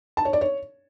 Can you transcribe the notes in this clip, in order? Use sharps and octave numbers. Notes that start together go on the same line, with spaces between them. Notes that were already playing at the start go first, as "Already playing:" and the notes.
A5
C#5
D5
C#5